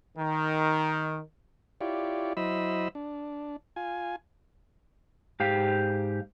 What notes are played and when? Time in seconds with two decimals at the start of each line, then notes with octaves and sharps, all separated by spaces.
0.18 D#3
1.81 E4 F4 G4 C#5 D5
2.37 F#3 E4 C5 D#5 B5 E6
2.95 D4
3.76 F4 G#5
5.40 G#2 G4 F5